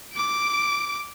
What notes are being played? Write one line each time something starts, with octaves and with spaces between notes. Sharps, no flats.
D6 D7